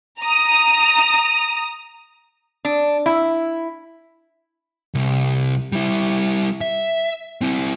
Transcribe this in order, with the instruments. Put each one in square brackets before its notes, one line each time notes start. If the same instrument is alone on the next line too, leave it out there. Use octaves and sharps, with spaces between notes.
[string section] A#5 D#6
[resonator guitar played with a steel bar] D4
E4
[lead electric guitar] C2
G3 E4
E5
C4 E4